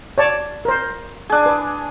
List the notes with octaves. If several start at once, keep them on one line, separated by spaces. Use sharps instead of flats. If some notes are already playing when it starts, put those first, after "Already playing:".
C#5 D5 A5
A#4 C5
D4 G#4
B4